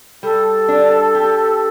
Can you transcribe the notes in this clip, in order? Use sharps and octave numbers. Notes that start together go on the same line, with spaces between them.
G3 A4
D4
G4